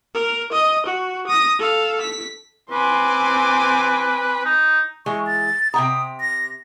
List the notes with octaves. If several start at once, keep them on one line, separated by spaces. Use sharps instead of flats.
A#4
D#5
F#4
D#6 A#6
A4 F5
B6
C4 B4 G#5 C6 D6
D#4
E3 G#3 C#6
A6
C3 G5 A#5 D#6
A#6